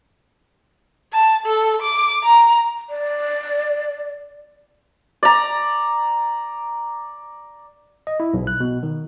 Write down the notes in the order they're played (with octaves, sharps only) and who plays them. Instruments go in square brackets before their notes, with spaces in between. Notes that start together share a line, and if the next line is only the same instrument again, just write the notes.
[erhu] A5
A4
D6
A#5
[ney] D5
[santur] D5 A#5
[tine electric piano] D#5
E4
B1
F#6
B2
D#3